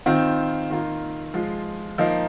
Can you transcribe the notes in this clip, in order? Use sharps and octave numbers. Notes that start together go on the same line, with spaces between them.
D#3 C4 F4
D#3 A#3 F4
F3 G#3 F4
F3 A#3 D#4